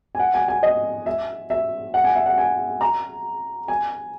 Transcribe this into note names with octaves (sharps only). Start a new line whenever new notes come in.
G#5
F#5
G#5
G#5
D#5
E5
E5
F#5
G#5
E5
F#5
G#5
A#5
G#5